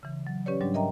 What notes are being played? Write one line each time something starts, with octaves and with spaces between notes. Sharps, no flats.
C#3 E3
F#3
C#4 G4 B4 C#5 D5
G#2 F#3 G3 D4
A#4 D#5 E5 G5 A#5